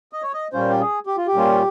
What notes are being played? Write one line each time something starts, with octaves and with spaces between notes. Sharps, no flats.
D#5
C#5
D#5
A#2 G3 C#4 F4 C5
G4
G#4
G4
F4
G4
A#2 G3 C#4 F4